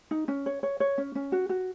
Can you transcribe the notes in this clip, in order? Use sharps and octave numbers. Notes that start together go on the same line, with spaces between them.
D#4
C#4
C#5
C#5
C#5
C#4
C#4
F#4
F#4